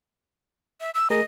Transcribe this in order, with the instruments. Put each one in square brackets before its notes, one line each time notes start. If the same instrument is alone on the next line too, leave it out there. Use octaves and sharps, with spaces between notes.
[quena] E5
E6
[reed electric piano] A3 G#4 A#4 [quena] D#5